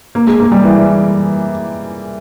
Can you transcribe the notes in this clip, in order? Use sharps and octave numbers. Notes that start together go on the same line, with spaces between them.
A#3
G#3
A#3
G3
E3